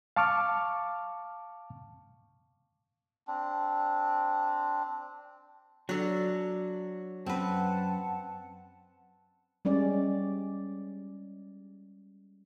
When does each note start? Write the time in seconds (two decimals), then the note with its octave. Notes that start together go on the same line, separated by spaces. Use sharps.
0.16 F5 A5 C#6 D6 F6
3.28 C4 D4
5.89 F#3 D4 A4
7.26 F#2 C4 B4 F#5 A5
9.65 G3 G#3 C#4 D5